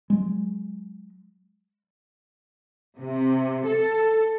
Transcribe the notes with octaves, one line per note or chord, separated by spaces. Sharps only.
F#3 G#3
C3
A4